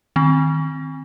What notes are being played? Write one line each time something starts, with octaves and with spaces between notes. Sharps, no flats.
D#3 C4